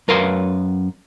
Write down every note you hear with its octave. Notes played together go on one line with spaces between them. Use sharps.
F#2 A#4 B4 F5 C6